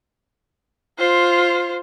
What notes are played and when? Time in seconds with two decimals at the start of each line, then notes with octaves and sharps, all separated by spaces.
0.99 F4 C5